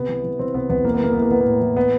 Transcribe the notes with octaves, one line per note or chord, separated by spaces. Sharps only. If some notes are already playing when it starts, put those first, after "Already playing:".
Already playing: C3 B3
E3
E3
E3 C4
C3 B3
E2 B3
E3 A#3
B3
E3 A#3
E3 B3
A#3
E3 B3
A2 A#3
E3
B3